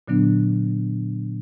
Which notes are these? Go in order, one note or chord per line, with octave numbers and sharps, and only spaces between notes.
A#2 D3 F#3 B3 D4